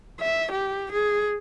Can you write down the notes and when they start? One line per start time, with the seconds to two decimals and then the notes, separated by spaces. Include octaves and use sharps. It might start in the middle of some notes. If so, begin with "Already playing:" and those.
0.20 E5
0.52 G4
0.92 G#4